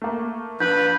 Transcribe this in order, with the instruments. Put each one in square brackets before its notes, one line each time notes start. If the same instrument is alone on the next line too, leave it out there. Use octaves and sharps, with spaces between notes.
[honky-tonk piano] A3 A#3
[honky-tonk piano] A#1 [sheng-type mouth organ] B4 B5 [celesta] G6